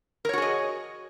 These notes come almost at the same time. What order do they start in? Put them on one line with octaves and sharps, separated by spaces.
A#4 C#5 F#4 G#4 D#5